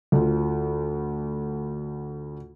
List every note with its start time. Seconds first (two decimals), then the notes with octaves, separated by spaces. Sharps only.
0.12 D2 F4